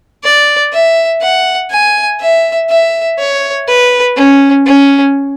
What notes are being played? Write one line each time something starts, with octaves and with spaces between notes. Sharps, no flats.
D5
E5
F#5
G#5
E5
E5
C#5
B4
C#4
C#4